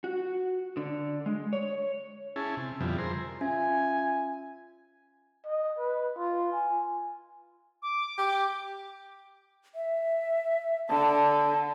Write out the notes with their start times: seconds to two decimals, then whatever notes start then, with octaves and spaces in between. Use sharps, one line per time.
0.04 F#4
0.77 D3
1.26 G#3
1.53 C#5
2.36 C#4 E4 G#4 A5
2.57 C3
2.81 F2 B2 D3 F3 G3 E4
2.98 G#4 A#4 C5
3.41 C#4 F4 E5 G#5
5.45 D#5
5.78 B4
6.17 F4
6.53 G#5
7.82 D6
8.18 G4
9.75 E5
10.89 D3 A5